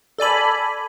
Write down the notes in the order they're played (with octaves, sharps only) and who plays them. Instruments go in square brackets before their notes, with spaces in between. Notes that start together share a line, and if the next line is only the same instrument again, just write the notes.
[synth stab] A4 D5 G#5 B5